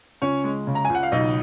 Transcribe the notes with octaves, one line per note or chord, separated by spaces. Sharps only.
C#2 C#4 C#5
G#3
C#3
A#5
G#5
C#2
F#5
F5
B1 D#4 D#5